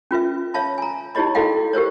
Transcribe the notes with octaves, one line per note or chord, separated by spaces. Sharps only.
C#4 F4 B4 E5
C#5 E5 F5 A5 B5
G#5 A#5
D#4 E4 G4 C#5 D#5 B5
E4 F#4 A4 D#5 F5 G5
G4 A#4 C5 C#5